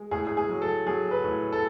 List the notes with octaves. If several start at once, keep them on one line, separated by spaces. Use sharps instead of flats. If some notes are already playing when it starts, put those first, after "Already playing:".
Already playing: G#3
A2 G#4
G#4
G#4
F#3
A4
F#3 G#4
B4
A2
A4